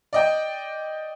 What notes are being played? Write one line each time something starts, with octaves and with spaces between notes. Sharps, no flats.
D5 D#5 G5